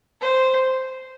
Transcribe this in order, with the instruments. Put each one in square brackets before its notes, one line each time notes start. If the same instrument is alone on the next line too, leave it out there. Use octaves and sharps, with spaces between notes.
[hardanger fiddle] C5